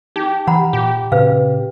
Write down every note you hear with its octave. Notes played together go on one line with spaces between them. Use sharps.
D#4 G4
E3 F#5 A#5 B5
A#2 G4
A#2 C#3 B4 F5